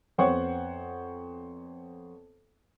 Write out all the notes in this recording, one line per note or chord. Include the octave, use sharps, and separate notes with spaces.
F2 B3 C5 C#5 F#5 C#6